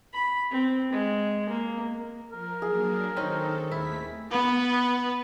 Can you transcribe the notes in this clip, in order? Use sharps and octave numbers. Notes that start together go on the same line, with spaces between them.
B5
C4
G#3
A#3
F3 A#4
F#3 A#3 D4 G#4
D#3 C4 C#4 D#4 A4
D#2 A3 E4 B6
B3 B4